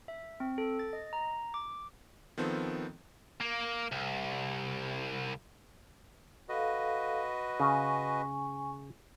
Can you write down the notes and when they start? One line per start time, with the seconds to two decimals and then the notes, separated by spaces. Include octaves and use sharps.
0.08 E5
0.40 C4
0.58 A4
0.79 A6
0.93 D#5
1.13 A#5
1.54 D6
2.37 D#3 F3 B3 C4 A4
3.41 A#3
3.92 C2
6.49 F#4 A4 B4 D#5 F5
7.60 C#3 G#5 C#6